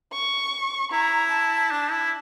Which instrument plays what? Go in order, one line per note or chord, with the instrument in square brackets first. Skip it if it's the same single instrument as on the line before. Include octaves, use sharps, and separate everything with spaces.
[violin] C#6
[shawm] E4 [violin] A#5
[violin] A5
[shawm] D4
E4